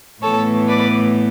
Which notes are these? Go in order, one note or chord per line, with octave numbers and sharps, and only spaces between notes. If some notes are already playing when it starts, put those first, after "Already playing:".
A2 E3 B3 A4 C#5
B4 D5